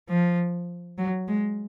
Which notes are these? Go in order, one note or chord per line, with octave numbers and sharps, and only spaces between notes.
F3
F#3
G#3